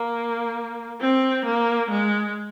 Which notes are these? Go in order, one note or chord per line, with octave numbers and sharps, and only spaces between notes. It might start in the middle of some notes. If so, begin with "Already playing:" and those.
Already playing: A#3
C4
A#3
G#3